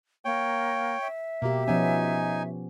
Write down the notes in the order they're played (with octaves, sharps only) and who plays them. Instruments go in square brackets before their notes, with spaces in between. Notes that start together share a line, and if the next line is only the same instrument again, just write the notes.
[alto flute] A#3 [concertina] C#5 G5
[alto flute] E5
[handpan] B2 G4 [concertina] A#3
[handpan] F3 B3 C#4 [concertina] D#4 G#5